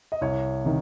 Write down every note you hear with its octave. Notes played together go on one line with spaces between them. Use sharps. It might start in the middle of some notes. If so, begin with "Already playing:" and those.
D#5
C2 C#5
C3 D#3